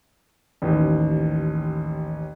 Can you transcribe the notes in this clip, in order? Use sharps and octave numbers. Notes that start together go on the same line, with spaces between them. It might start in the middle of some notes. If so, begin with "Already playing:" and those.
A1 D#2